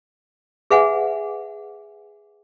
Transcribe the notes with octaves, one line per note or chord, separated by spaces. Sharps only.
G#4 B4 E5 F#5 G#5